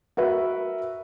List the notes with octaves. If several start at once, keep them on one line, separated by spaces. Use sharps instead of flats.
F#4 A#4 B4 E5